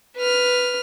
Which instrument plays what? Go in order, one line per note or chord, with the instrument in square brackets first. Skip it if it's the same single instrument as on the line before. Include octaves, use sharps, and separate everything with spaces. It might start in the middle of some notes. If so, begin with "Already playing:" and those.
[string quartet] B4 F6